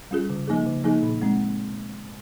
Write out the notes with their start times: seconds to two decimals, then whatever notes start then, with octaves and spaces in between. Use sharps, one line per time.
0.11 G3 C#4 F4 G#4
0.30 C#3
0.48 F3 A#3 D#4 G#4
0.66 C#3
0.84 F3 A#3 D#4 G#4
1.02 A#2
1.21 G#3 C4